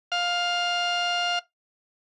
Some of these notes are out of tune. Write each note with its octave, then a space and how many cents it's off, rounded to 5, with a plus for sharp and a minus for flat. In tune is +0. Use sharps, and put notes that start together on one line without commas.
F5 +10